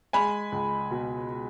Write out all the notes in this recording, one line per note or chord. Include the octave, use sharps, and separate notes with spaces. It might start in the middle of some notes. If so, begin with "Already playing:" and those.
G#3 G#5 B5
C#2
B2